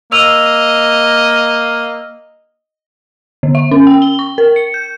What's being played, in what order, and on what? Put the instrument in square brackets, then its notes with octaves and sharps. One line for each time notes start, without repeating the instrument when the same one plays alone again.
[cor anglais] A#3 [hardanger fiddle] D#5 [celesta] E6 F7
[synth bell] D3
E5
C#4
G5
G7
C#6
A#4
C#7
G6